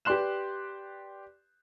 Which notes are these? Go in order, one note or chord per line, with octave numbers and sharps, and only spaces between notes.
G4 B4 D5 C6 F#6 E7